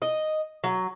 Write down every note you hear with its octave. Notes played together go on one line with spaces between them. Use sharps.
D#5
F#3